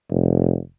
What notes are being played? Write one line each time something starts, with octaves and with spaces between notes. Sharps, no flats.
F1